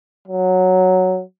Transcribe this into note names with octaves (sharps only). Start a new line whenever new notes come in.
F#3